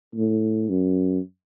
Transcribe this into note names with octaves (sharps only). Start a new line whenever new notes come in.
A2
F#2